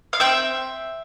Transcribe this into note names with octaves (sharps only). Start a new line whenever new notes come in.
F5
C4 E5 G5